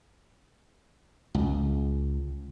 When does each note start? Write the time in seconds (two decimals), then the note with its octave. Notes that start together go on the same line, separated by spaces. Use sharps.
1.34 C#2